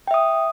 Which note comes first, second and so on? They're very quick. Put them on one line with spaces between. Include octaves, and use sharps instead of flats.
G5 E5 D#6